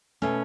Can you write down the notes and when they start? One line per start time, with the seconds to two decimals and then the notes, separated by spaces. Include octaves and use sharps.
0.22 B2 A3 C#4